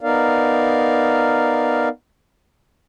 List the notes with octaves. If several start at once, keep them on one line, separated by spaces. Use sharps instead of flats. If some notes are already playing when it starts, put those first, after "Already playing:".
B3 D#4 A#4 D5 F5